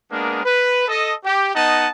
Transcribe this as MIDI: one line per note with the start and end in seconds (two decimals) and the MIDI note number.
0.11 0.40 56
0.11 0.40 58
0.11 0.40 59
0.11 0.40 62
0.11 0.40 70
0.45 0.85 71
0.88 1.13 69
0.88 1.13 75
1.24 1.51 67
1.55 1.88 59
1.55 1.88 63
1.55 1.88 75
1.55 1.88 78
1.55 1.88 81